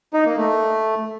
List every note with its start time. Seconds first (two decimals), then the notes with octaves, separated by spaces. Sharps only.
0.13 D#4
0.25 A#3
0.37 A3